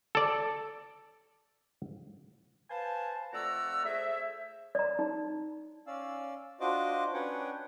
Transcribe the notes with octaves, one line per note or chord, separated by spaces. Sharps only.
A4 D5
B4 C5 F5 G#5 A5
F2 A3 D5 F#5 A#5 E6
A3 G#4 C5 E5
D5 A#5
D#4
C#4 D5 F5 E6
D4 F4 F#4 C5 D#5 D6
C#4 D4 B4 C#5 F#5 G5